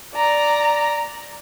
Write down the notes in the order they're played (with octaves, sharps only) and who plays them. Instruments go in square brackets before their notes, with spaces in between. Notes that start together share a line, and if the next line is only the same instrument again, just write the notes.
[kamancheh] D5 A#5